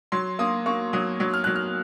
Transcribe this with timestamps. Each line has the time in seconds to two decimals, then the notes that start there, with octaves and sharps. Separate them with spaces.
0.12 F#3 C6
0.39 A#3 D#6
0.66 A#3 C#6
0.93 F#3 D#6
1.20 F#3
1.33 F6
1.44 F#3 F#6
1.56 F6